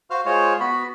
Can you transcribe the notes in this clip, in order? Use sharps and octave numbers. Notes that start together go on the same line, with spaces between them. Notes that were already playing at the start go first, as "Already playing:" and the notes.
F#4 C5 F5 F6
G#3 F4 C5 C#5
B3 F#4 B5